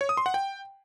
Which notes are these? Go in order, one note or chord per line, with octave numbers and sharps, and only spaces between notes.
C#5
D#6
C6
F#5
G5